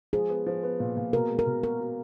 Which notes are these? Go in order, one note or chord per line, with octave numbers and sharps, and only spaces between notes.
F3 G#4
B3
F3
B3
A#2
A#2
B2 A#4
G#3
A#4
B2
F#4 A#4
F#4